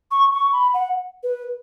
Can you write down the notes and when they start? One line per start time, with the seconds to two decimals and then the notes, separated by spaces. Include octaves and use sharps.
0.11 C#6
0.32 C#6
0.53 B5
0.74 F#5
1.23 B4